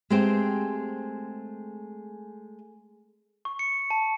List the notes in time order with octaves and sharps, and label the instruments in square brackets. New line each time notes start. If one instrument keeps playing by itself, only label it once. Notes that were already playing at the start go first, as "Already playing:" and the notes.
[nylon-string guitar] G#3 A3 C4 G4 C5
[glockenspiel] C#6
C#7
A5